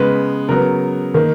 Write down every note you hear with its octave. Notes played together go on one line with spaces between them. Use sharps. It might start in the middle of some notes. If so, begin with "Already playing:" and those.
Already playing: C#3 G#3 B3 B4
C#3 F#3 B3 A#4
D#3 A#3